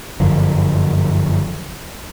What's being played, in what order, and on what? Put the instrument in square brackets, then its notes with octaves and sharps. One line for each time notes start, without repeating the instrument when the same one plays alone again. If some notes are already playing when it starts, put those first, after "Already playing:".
[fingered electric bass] G1 F#2 D3 F3